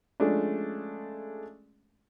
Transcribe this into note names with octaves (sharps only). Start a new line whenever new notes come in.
F3 G#3 A3 C#4 D4